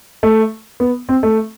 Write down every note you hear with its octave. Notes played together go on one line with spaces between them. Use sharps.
A3
B3
C4
A3